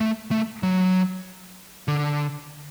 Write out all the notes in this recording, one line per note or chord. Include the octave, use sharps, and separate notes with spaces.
A3
A3
F#3
D3